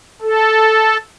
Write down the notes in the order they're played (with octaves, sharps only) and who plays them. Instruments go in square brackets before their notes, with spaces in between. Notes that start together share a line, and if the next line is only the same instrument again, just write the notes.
[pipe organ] A4